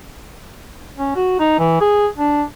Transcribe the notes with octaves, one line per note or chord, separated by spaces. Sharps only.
C#4
F#4
D#4
E3
G#4
D4